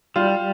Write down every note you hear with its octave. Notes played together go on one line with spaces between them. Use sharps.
G3 F4